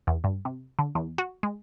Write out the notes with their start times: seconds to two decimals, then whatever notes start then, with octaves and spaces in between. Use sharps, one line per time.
0.07 E2
0.24 G2
0.45 C3
0.79 D3
0.95 E2
1.18 F#4
1.43 G#3